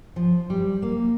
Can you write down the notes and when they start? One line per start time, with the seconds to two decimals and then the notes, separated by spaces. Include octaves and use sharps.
0.16 F3
0.50 G3
0.82 A#3